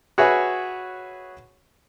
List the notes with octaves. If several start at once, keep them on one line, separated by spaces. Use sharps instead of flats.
F#4 G#4 B4 C#5 E5